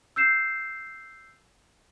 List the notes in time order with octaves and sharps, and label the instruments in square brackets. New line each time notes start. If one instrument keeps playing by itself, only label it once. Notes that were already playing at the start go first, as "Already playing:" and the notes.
[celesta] E6 G6 C7 E7